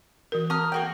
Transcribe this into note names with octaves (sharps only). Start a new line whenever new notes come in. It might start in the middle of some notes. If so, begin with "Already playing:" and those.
E3 F#4 A#4
C4 A#5 D#6 F6
A#3 F#4 G5